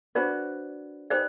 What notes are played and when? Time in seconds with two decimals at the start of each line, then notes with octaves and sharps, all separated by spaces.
0.15 D4 F#4 B4 C5 D5
1.10 D#4 G4 B4 C5 D5